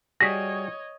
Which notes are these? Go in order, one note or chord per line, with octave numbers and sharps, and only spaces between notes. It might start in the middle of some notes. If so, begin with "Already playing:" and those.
G3 F#4 G#4 C#5 D#5 A#6 B6